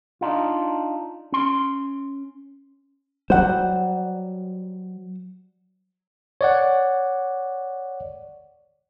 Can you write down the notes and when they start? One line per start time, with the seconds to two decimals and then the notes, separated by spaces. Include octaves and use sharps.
0.21 D4 D#4 F4
1.32 C#4 C6
3.30 F#3 G3 C5 F#5
6.41 C#5 D5 F#5